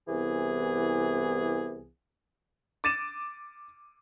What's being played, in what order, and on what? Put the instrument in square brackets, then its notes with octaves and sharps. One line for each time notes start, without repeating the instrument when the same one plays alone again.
[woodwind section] C2 E3 B3 G#4
[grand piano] D6 A6 D#7 E7